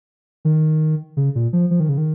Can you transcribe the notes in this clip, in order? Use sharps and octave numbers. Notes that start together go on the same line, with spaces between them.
D#3
C#3
A#2
F3
F3
D#3
C#3
D#3